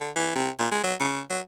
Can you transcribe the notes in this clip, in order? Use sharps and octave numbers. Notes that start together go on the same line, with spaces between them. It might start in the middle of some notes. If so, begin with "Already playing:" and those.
D3
E3
C3
A#2
G#3
F#3
C#3
F#3